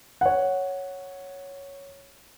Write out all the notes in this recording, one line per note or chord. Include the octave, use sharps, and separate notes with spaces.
C#5 F#5